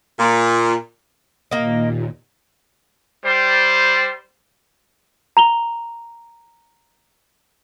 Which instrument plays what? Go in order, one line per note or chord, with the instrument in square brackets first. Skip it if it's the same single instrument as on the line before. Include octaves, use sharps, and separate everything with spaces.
[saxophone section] A#2
[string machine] D#2 A#2 [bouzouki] A#3 D#5
[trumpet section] G3 C5
[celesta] A#5 F7 G7